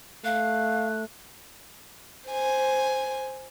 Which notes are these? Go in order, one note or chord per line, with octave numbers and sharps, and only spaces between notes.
A3 F5 F#6
C5 G#5